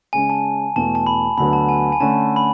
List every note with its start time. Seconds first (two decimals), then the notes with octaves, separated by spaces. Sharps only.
0.13 C#3 G#3 C#4 G#5
0.30 A5
0.76 E2 B2 A3 A5
0.95 A5
1.07 B5
1.38 D2 D3 F#3 B3 B5
1.53 A5
1.69 G#5
1.92 G#5
2.00 D3 A3 C#4 A5
2.36 B5